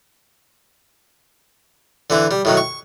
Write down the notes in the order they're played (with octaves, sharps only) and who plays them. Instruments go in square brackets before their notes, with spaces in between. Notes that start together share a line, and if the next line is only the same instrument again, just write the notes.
[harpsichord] D3 E3 E4
G3
A2 D#3 F#3
C#6